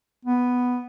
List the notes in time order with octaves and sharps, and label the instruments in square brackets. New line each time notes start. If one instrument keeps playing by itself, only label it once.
[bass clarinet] B3